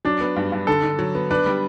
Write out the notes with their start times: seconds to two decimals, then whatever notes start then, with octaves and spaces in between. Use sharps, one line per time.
0.05 F#3 D4
0.21 B3
0.36 G2
0.52 G2
0.67 D3 A4
0.83 D3
0.99 F#3
1.15 B3
1.30 D4 B4
1.46 G3